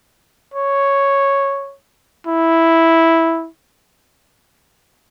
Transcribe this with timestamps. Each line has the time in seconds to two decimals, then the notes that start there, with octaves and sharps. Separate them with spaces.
0.54 C#5
2.27 E4